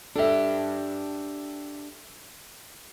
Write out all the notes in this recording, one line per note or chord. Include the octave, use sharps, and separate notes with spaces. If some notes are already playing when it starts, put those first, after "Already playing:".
D4 G4 A4 E5